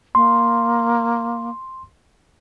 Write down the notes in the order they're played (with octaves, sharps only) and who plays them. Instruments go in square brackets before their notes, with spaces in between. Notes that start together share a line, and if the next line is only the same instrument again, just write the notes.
[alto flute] A#3 [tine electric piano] C6